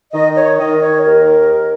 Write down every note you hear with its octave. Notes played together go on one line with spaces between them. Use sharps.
D#3 D#5
C#5
D#3 D#5
C#5
D#2 A#4